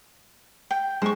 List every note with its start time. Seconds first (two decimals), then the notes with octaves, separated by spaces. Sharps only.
0.71 G5
1.02 G#3 C5 C#6